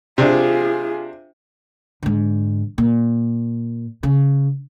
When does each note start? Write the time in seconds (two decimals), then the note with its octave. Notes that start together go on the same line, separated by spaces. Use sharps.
0.18 C3 D4 F4 G#4
2.03 G#2 D3
2.78 A#2
4.03 C#3